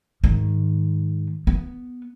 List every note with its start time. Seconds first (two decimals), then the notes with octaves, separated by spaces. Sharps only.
0.24 G#2 D#3
1.47 B3